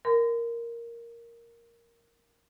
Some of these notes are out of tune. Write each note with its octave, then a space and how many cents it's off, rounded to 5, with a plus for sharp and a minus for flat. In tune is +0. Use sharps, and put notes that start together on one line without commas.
A#4 +0 C6 -40